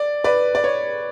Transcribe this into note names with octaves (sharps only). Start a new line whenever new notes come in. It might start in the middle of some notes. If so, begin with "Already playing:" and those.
Already playing: D5
B4 D5
D5
C#5